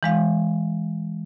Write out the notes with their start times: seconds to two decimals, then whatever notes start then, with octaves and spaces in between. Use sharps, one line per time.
0.03 E3 G#3 F5